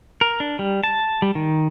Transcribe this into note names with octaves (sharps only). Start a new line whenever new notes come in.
A#4
D4
G3
A5
G3
D#3